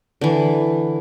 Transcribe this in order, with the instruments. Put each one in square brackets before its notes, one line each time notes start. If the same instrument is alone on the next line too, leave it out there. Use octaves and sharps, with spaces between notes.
[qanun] D3 E3